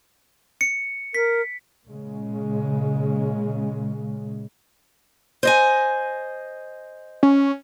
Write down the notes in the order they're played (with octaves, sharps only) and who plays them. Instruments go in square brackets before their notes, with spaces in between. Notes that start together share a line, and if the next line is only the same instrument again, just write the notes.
[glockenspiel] C#7
[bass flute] A#4 [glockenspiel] B6
[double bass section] A#2 C#3 G#3
[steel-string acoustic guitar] C5 D#5 G#5
[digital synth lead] C#4